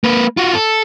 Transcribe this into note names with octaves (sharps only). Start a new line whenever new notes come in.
A#3 B4
F4 F#4
A4